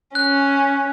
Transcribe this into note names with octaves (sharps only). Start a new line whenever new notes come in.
C#4 F#6